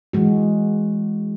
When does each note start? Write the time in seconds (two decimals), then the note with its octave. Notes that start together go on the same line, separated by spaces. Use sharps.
0.13 E3 F#3 G#3 F#4